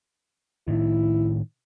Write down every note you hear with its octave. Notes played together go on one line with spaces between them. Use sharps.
A2 D#3 E4